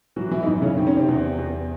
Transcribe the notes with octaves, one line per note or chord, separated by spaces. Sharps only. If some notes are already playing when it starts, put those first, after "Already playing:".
E3 F#3 F#4
E3 E4
D#4
F#2 E3 E4
C#3 C#4
D#3 C4
C#4
C3 C4
E2
E2